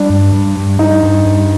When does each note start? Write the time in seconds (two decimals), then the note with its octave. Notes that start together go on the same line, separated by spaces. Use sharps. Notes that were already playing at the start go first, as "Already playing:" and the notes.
Already playing: G3 D4
0.10 G2
0.33 G2
0.57 G2
0.79 G2 D#4
1.03 G2
1.25 G2